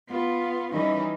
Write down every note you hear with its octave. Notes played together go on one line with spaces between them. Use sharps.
B3 F4
E3 G3 C#4 D#4